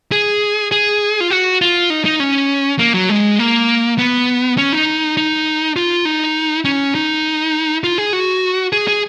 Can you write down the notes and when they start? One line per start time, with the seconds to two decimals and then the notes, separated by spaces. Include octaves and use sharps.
0.12 G#4
0.72 G#4
1.21 F4
1.30 F#4
1.61 F4
1.90 D#4
2.05 D#4
2.20 C#4
2.79 A#3
2.94 F#3
3.09 G#3
3.39 A#3
3.98 B3
4.58 C#4
4.73 D#4
5.17 D#4
5.76 F4
6.05 D#4
6.65 C#4
6.95 D#4
7.84 F4
7.98 G#4
8.13 F#4
8.73 G#4
8.88 G#4